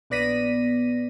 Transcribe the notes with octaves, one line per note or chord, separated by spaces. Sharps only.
A#1 B3 D5 A#6 B6 D#7